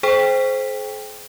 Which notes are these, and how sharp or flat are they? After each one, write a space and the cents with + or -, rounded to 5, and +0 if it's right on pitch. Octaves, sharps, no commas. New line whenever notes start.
G#4 +45 C5 +0 G5 +20